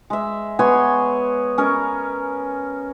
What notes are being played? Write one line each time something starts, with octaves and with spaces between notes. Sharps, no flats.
G#3 E5
B3 C#5 G#5 C6
C#4 A#4 D#5